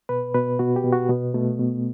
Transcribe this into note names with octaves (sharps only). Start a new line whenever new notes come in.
B2 B4
B2 B4
B2 F#4
G4
B2
F#4
B2 B3
B2 A3
B2